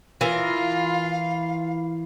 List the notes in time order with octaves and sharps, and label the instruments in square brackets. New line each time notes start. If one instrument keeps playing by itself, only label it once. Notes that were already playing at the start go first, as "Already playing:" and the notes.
[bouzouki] E3 A#4 [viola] F4 [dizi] F5